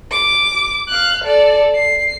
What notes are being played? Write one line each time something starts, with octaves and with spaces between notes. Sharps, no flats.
D6
F5 F#6
A4 D5
C7